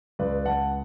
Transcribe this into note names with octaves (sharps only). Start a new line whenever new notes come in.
C#2 B4 D5
C#2 F#5 A5